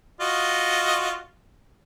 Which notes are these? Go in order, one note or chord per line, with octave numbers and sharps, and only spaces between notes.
F4 F#4 D#5